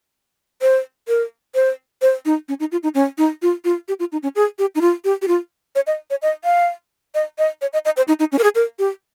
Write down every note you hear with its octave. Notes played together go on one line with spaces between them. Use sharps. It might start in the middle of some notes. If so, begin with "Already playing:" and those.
C5
A#4
C5
C5
D#4
C#4
D#4
F4
D#4
C#4
D#4
F4
F4
G4
F4
D#4
C#4
G#4
G4
D#4
F4
G4
G4
F4
C#5
D#5
C#5
D#5
F5
D#5
D#5
C#5
D#5
D#5
C5
D#4
D#4
C#4
A#4
G#4
A#4
G4